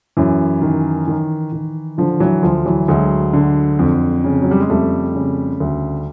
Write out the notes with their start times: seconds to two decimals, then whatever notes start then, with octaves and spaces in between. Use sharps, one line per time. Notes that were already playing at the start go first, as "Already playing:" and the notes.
0.17 F#2 E3
0.62 D#3
1.08 D#3
1.52 D#3
1.98 D3 F3
2.20 E3 F#3
2.43 D2 F3
2.66 E3 F#3
2.88 D2 F#3 G#3
3.33 D3
3.79 F2
4.24 C#3
4.42 F#3
4.51 G3
4.60 G#3
4.70 F2 G3 A3
5.15 C#3
5.60 D2